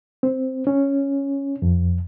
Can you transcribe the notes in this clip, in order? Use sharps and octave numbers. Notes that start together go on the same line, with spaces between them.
C4
C#4
F2